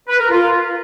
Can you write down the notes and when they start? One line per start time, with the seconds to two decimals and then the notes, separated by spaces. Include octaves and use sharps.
0.09 B4
0.19 A#4
0.30 F4